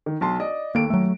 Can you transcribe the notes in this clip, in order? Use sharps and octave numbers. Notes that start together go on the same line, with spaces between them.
D#3
B1 A5 C6
D5 D#5
D#2 A#3 A4 D7
F#3 A3